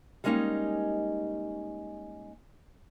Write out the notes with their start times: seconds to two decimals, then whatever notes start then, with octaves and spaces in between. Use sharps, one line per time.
0.24 G3 G#3 A#3 C#4 D#4 G4